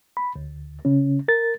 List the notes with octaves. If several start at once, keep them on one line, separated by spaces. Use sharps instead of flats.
B5
D2
C#3 C#4
A#4 A6